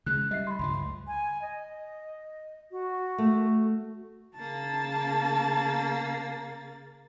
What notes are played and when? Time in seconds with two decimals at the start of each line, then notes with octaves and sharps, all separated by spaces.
0.06 C#3 G#3 F#6
0.31 G3 D#5 E5 C7
0.47 B5 C6
0.59 C#2 G2 F3
0.73 C#2
1.07 G#5
1.42 D#5
2.71 F#4
3.18 A3
4.38 C#3 A#3 A5 A6